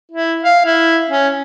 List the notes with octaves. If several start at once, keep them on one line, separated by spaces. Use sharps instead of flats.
E4
F5
E4
C#4